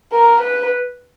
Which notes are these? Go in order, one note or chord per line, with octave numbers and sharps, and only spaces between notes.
A#4
B4